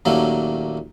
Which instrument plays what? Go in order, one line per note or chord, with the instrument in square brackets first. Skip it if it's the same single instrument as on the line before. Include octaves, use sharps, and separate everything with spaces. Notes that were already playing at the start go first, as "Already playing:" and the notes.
[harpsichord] D#2 A#2 F#3 A3 A#3 C#4